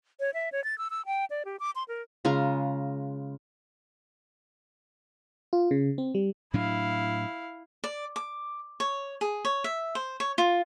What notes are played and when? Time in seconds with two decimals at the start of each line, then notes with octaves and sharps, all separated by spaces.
0.20 C#5
0.34 E5
0.52 C#5
0.64 A6
0.78 E6
0.90 E6
1.06 G5
1.30 D5
1.45 G4
1.60 D6
1.75 C6
1.88 A#4
2.25 C#3 G#3 F4 A#5
5.53 F4
5.71 C#3
5.98 C4
6.15 G3
6.54 A2 F#3 D4 E4 F5
7.84 D5
8.16 D6
8.80 C#5
9.21 G#4
9.45 C#5
9.64 E5
9.95 C5
10.20 C#5
10.38 F4